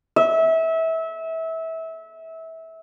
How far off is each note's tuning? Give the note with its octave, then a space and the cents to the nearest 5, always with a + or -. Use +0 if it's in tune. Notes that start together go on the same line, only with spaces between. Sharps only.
E5 -25